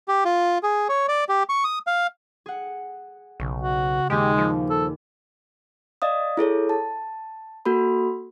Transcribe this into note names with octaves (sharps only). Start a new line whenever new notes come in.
G4
F4
G#4
C#5
D5
G4
C#6
D#6
F5
G#4 F#5
B1 C#3
F#4
D#1 D#2 G#3 G4 G#4
F3
A4
D5 D#5 F5 D#6
E4 G#4 A4 C#5
A5
A#3 F#4 A4 B5